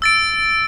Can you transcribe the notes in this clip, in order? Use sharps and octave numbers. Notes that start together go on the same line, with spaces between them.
E6 A6 D7